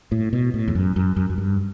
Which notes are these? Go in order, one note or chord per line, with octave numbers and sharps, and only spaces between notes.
A2
B2
A2
E2
F#2
F#2
F#2
F#2
G2